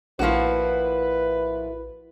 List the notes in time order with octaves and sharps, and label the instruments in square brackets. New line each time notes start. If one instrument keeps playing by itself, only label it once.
[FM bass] A#1 [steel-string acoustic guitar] A2 A#3 E4 [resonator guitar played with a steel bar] F3 F#4 [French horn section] B4